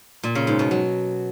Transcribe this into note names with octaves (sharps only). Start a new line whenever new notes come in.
A#2
C#3
G#2
B2
F#3